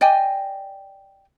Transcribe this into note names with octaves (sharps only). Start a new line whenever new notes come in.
D5 D#5 G5 G#5